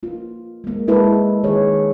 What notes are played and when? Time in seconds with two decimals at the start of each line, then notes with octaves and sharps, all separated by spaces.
0.03 A#3 F4
0.64 G#3 A#3
0.88 G#3 E4 A4 B4
1.43 D#3 G#4 C#5